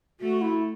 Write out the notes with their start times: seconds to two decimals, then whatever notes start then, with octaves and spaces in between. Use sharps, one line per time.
0.20 A3 F#4
0.41 E4